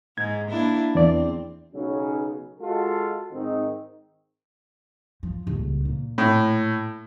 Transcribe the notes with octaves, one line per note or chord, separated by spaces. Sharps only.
G#2 G#6
A#3 D4 E4
E2 C4 D5
B1 C#3 F#3 C#4
G#3 F4 F#4 A4
G#2 D#3 C4 D#4
F3
D#1 C#2
A#2
A2